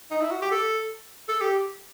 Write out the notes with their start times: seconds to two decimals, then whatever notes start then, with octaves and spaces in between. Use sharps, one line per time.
0.11 D#4
0.21 E4
0.31 F#4
0.42 G4
0.51 A4
1.29 A4
1.41 G4